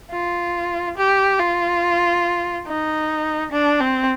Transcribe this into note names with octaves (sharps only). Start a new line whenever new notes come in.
F4
G4
F4
D#4
D4
C4